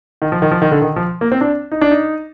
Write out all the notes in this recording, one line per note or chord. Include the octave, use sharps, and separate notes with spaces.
D#3
F3
D#3
F3
D#3
D3
D#3
F3
A#3
C4
D4
D#4
D4
D#4